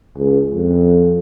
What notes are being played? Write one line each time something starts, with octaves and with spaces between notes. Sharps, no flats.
C#2
F2